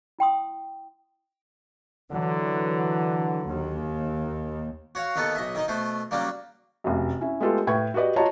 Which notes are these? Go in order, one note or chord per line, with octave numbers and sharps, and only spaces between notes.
E4 G5 C6 D#6
D3 E3 F#3
D#2
F#4 C#5 F5
D#2 B3 D#4 A4 C#6
B1 D#5 E5
D#3 D#4 D#5
B2 A3 C5
C#3 F#3 G3 A#3
F1 F#2
C#4 E4
G#3 A3 B3 F4 G4 A4
A2 B4 G5 C#6 G#6
F#4 G4 B4 D5 D#5
F4 F#4 C#5 D#5 A5 A#5